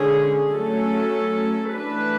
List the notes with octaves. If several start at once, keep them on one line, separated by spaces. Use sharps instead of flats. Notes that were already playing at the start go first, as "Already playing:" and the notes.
Already playing: D3 G#3 C#4 G#4
F#3 A3 C#4 A4
E3 A3 D4 B4